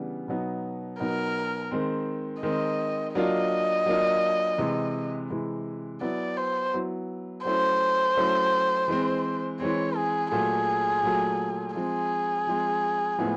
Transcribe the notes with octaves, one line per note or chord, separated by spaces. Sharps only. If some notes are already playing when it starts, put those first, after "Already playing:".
Already playing: C#3 E3 G3 B3 D4
B2 F#3 B3 D#4
B2 F#3 B3 D#4 A#4
D#3 G#3 C4
D#3 G#3 C4 D#5
F#3 A#3 D4 F4 D#5
F#3 A#3 D4 F4
C3 E3 G#3
C3 E3 G#3
F#3 B3 E4 D5
C5
F#3 B3 E4
F#3 A3 C#4 E4 C5
F#3 A3 C#4 E4
E3 G#3 C4
E3 G#3 C4 C#5
G#4
A#2 F#3 A3 G#4
A#2 F#3 A3
F3 G#3 C4 G#4
F3 G#3 C4
A2 F3 G#3 B3 E4